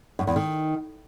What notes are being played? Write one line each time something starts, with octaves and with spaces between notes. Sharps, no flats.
F#2
E2
D#3